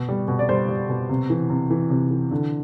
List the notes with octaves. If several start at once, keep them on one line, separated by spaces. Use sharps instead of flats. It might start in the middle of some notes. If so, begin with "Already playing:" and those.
Already playing: B2
G3
B2
D5
G3 C5
G3
B2
C3
E3
C3
E3
C3
E3
D3